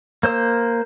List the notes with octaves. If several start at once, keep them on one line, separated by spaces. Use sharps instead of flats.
A#3 C5 E6